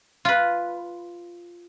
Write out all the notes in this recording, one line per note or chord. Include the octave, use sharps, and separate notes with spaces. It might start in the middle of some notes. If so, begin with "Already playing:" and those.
F4 B4